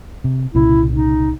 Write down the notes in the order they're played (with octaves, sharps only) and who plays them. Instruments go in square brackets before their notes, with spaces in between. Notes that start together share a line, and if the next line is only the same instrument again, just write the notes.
[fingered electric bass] C3
[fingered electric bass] C2 A#2 C#3 [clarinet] E4
[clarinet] D#4